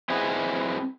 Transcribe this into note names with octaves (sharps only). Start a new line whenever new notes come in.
C4 E4 G#4 B4 D#5